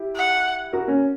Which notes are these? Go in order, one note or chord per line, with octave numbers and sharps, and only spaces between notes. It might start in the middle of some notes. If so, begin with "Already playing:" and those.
Already playing: E4 G4
F#5
F#4 A#4
A#3 C#4